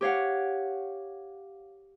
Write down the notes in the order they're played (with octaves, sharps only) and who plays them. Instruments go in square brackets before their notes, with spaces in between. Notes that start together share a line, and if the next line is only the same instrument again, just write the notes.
[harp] G4 C#5 F5 F#5